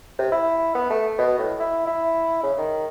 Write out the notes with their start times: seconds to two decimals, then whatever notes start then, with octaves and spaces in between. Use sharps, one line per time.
0.19 C3
0.32 E4
0.75 B3
0.90 A3
1.19 B2
1.39 A2
1.60 E4
1.87 E4
2.43 C#3
2.58 D#3